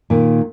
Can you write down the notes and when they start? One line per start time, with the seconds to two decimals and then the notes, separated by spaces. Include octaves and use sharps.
0.10 A#2 D#3